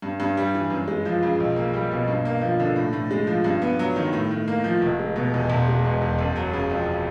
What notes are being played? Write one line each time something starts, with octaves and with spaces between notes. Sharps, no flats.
G2
G2
G3
E3
F#2
G#3
F3
C#3
B1
A#3
G3
B2
G2
A#3
F3
D3
A2
A2
G#3
F3
G2
B3
F#3
D#3
A2
A2
A#3
F3
F1
G#3
B2
E2
E1
G#3
B2
E2
F#1
F#3
C#3
F2